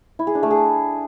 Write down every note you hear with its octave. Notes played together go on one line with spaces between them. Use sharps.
E4
G#4
D4
A3
G#4